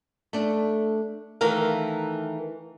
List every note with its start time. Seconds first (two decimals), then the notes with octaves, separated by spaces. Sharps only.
0.33 A3 D4
1.41 D#3 E3 A3 A#4 F5